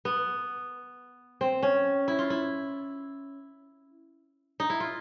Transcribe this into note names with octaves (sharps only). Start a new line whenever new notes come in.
B3
C4
C#4
E4
F4
E4
D#4
E4
F4